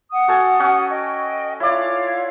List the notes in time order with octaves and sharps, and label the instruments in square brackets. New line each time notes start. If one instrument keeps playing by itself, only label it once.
[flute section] F#5 D#6
[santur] F#4 A4 G#5
C#4 F#4
[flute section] D#5 G5
[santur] E4 D5 [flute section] F4 C#5 F5